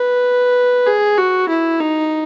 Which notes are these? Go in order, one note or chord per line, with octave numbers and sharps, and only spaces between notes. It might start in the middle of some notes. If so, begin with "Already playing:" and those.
Already playing: B4
G#4
F#4
E4
D#4